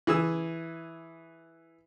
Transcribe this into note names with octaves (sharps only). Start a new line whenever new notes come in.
E3 G#4 E6